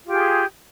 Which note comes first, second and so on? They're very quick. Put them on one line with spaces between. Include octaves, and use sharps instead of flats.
F4 G4 G#4